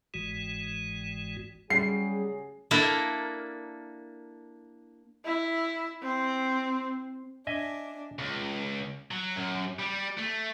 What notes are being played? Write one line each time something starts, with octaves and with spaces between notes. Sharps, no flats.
G1 G#2 E3 G#3 F#4
C#3 F#3 G3 G#4 C7
A#3 D4 E4 A4 A#4
E4
C4
D4 D#5 E5 G#5
C#2
F#3
F#2
G3
A3